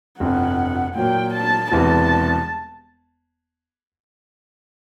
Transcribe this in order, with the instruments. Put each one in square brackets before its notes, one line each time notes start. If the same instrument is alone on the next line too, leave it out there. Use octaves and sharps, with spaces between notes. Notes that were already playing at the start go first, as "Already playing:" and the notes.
[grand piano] G1 F2 C3 [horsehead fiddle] F#5
[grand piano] A#2 F#3 A#3 [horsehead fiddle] G5
[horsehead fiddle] A5
[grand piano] E1 E2 C3 E3 G3 [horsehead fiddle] A5